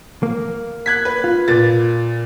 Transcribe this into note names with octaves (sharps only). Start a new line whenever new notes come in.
A#3
F#6 G#6 B6
B4
F4
A#2 A6